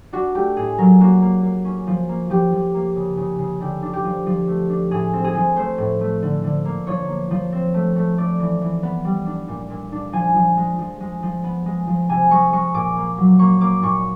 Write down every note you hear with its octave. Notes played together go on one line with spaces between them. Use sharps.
D4 F#4
A3 G4
A2 G#4
F#3 A#4
A#3 F#4
A#3
A#3
C#4
F3
A#3
F3 G4
F3
A#3
C#3
C#3
C#3
D3 G4
D4
G4
F3
F3
A3
D4
A2 G#4
C4
G#4
F3
A3 C5
A2
A3
D3
D3
A#3
F3 C#5
A#3
F3
C4
A3
A3
A3 D5
E3
E3
B3
G3
D4
A#2
A#2
D4
F3 G#5
F3
G#3
F3
G#3
F3
B3
G#3
F3
C3 G#5
G#3 C#6
G#3 C#6
A#2 D6
A#3
F#3
A#3 C#6
A#3 D6
A#2 C#6